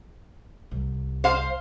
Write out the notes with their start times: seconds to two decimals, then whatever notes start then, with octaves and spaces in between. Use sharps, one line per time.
0.71 C2
1.24 C5 F5